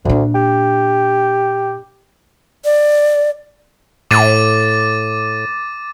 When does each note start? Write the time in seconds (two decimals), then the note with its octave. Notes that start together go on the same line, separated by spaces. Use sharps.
0.05 D2 A#2 D4
0.35 G4
2.65 D5
4.11 A2 D6 A6 D#7